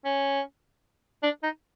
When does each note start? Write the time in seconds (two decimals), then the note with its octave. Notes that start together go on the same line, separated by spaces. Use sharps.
0.05 C#4
1.23 D4
1.43 D#4